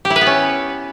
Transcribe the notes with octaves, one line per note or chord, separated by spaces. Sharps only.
G4
E4
B4
B3
C#4